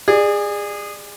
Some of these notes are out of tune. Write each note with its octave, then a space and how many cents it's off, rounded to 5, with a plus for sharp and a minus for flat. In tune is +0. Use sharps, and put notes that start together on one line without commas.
G#4 -20 D5 +25